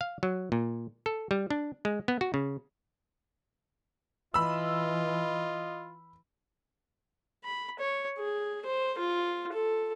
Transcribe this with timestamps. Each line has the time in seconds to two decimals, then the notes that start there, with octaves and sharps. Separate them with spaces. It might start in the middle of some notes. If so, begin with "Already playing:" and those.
0.01 F5
0.23 F#3
0.52 A#2
1.06 A4
1.31 G3
1.50 D4
1.85 G#3
2.08 B3
2.21 F#4
2.34 C#3
4.34 E3 F4 D#5 B5 E6
7.44 B5
7.79 C#5
8.18 G#4
8.66 C5
8.98 F4
9.53 A4